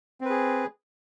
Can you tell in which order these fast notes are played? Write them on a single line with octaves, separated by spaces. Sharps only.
C4 B4 G#4